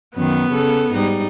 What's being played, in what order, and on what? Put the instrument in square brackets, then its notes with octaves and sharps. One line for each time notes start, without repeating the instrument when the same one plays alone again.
[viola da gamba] F#2 D#3 [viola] B3
[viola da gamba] C#3 A4
G#2 G3 D#4